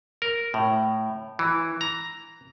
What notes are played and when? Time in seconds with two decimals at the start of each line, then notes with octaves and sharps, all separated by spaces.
0.22 A#4
0.54 A2
1.39 E3
1.81 A#5